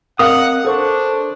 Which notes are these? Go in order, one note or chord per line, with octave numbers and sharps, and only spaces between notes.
C4 A#4 F5 F#5 D#6
D4 A4 C5 C#6